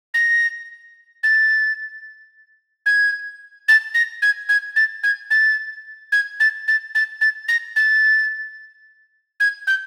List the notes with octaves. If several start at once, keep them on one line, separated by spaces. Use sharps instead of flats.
A#6
A6
G#6
A6
A#6
G#6
G#6
A6
G#6
A6
G#6
A6
A6
A6
A6
A#6
A6
G#6
G6